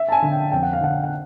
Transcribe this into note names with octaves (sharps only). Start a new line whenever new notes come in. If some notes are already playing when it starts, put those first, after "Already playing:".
Already playing: E5
A5
G#5
D3
G5
F2 G5
F#5
F5
D3 F#5
F#5